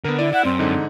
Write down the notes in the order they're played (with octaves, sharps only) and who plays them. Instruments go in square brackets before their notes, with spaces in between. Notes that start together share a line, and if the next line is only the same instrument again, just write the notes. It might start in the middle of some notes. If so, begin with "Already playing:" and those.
[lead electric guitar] D3 [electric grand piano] B3 A#4
[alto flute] E4 [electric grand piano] D5
[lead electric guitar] E4 [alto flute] F#5
[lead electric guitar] F#2 [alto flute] C4
[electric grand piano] G#2 D3 D#4